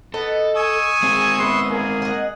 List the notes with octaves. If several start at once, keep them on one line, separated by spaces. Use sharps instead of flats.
B3 A4 D#5
G#5 C#6 D#6 E6
G#3 C4 G#4
B3 B4 E5 C6
A#3 G#4
D#5 F#5